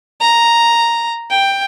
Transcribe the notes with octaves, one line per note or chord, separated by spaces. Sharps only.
A#5
G5